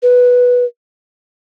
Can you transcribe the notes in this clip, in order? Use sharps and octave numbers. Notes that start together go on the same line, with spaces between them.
B4